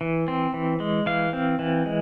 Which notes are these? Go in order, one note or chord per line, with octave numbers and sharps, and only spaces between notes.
E3
C4
E3
G#3
E3 F5
C4
E3
G#3